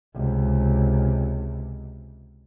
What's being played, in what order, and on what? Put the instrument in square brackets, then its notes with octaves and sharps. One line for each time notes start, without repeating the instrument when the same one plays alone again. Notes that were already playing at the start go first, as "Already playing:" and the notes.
[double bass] C#2 C3